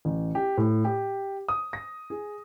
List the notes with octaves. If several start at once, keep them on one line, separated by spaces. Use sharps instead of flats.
A1
G4
A2
G4
D#6
A#6
G#4